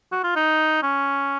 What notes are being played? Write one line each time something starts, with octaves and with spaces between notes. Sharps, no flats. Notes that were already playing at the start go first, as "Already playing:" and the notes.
F#4
F4
D#4
C#4